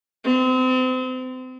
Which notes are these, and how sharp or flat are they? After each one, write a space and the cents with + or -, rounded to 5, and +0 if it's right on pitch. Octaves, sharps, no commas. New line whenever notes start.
C4 -35